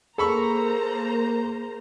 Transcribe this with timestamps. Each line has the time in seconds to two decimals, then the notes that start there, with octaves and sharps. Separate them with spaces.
0.18 A#3 G#4 A4 C5 A#5 B5 C#6 C#7